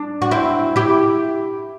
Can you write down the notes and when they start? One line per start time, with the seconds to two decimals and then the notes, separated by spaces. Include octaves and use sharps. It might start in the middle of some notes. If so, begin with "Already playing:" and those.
Already playing: D4
0.22 F#4
0.31 C4 E4
0.76 E4 G4